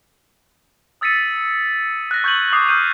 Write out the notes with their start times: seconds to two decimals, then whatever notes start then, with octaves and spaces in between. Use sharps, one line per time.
1.01 D#6 E6 A6 B6 C#7 D#7
2.11 F#6 A#6
2.24 C#6 G6 G#6 A#6 F#7
2.52 D6 D#6 C7 F#7
2.68 D#6 F6 G6 D#7